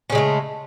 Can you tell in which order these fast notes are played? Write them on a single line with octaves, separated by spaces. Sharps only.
C#4 C#3 G#3 A3